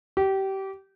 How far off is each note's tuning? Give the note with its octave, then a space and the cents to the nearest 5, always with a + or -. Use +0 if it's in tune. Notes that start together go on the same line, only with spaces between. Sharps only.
G4 -25